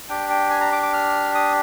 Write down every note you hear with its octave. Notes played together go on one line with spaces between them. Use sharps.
D4 G4 G5
G5
G#5
A#5
D6
D6
F6
D#6